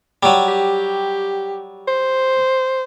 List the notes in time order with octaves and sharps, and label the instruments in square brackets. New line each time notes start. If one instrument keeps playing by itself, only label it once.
[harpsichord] F#3 G3
[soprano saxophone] G4
C5